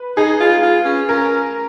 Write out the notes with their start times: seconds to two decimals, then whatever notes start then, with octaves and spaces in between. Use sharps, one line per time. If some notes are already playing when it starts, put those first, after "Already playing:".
Already playing: B4
0.17 D#4 G#4
0.40 F4
0.62 F4
0.85 C#4
1.09 C#4 A#4